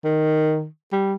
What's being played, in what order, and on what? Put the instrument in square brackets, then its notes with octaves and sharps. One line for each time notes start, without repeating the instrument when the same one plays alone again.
[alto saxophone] D#3
G3